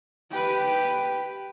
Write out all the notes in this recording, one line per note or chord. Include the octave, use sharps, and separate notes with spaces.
G4 B4